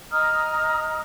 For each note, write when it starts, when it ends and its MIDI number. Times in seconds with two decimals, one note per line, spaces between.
0.12 1.02 75
0.12 1.02 82
0.12 1.02 87
0.12 1.02 89